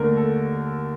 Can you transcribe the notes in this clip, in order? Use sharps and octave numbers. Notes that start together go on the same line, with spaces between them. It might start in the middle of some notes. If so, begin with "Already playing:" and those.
Already playing: D#2 D3 A3 A#4
A4